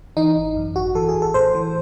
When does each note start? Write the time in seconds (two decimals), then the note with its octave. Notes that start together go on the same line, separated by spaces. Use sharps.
0.17 E3 D#4
0.36 G#1
0.56 F#2
0.76 G#1 F#4
0.95 E3 A4
1.09 G#4
1.15 A1
1.22 A4
1.34 A2 C5
1.55 E3